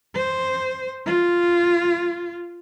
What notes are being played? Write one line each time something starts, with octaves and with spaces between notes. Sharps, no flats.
C5
F4